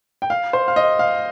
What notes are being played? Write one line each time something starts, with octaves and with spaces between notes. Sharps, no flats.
G5
F5
C5
F5
D#5
F5